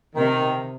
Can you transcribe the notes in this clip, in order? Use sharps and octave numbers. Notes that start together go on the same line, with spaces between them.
C3 D#3